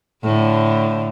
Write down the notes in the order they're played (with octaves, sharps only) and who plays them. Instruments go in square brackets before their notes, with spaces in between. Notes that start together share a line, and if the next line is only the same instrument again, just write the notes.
[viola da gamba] A2 D3